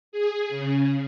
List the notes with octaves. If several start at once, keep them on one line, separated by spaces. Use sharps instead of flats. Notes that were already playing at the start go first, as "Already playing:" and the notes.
G#4
C#3